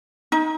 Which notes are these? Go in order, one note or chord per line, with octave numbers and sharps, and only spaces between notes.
D#4